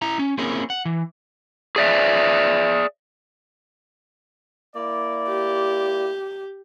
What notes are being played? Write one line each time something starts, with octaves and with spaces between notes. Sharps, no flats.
E4 E5 A#5
C#4
A#3 C4 C#4 E4 G#4 A#4
F#5
E3
G#4 D5 E5
A#3 E4 D5
G4